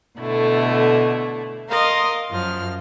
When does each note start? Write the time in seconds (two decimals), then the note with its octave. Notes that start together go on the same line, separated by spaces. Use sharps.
0.18 B2 D3 A3 E4
1.69 A#4 D#5 F5 C6
2.29 F#2 F3 F6